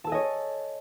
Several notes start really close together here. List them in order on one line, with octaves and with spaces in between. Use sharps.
A5 A4 G#5 D#5 C#5